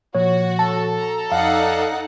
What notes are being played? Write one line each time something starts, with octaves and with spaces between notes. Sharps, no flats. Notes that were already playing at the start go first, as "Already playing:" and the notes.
A#2 F3 F#4 C#5
A4 A5
A#5
F2 D#4 D5 F5 F#5